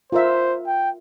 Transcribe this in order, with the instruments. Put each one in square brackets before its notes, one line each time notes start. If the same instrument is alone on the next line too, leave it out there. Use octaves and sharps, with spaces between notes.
[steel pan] F4 A#4 E5 [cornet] C5
[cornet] G5